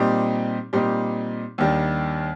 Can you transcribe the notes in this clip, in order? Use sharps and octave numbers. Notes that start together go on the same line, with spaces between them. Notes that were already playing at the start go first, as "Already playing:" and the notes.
Already playing: A#2 G3 C4 D#4 G4
A#2 G3 C4 D#4 G4
D#2 D#3 G3 D4